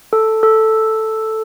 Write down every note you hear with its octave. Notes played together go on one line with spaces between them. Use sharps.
A4
A4